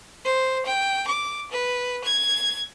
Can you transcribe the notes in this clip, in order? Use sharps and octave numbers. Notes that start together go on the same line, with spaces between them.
C5
G5
D6
B4
G#6